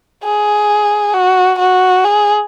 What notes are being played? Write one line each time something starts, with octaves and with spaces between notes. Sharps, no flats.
G#4
F#4
F#4
G#4